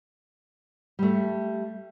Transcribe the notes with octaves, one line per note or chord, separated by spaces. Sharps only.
G3 A3